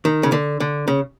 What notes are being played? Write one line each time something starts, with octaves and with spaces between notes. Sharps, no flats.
D#3
C#3
D3
D3
C#3